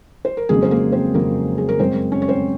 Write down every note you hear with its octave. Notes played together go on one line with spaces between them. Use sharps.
C5
A#4
F2 C#3 F#3 G#3 A#3 G#4
C5
A#3 A#4
C4 C5
F2 C#3 F#3 A#3 A#4
G#4
A#4
F#2 C#3 G#3 C4 C5
C#4 C#5
C#5
C4 C5